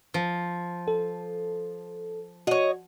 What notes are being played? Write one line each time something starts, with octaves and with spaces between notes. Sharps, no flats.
F3
A4
F#4 C#5 D#5